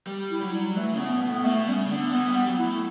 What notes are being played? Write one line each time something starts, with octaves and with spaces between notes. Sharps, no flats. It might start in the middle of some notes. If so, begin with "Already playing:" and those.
G3
E4
F#3
G3
E3 A3
C#3 B3
B2
B3
A2
B2 A3
C#3 G3
C#3
D3 B3
E3 B3
G3
B3
G3
F#3
E4
A3